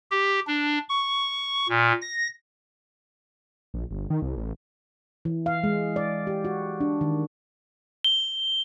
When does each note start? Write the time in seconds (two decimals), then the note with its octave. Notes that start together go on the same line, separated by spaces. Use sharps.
0.11 G4
0.47 D4
0.89 C#6
1.69 A#2
2.02 A#6
3.74 A#1
3.91 G1
4.10 D#3
4.22 C2
4.37 A1
5.25 E3
5.46 F5
5.64 G#3
5.96 D5
6.27 G4
6.45 F#4
6.80 D4
7.01 D#3
8.04 G7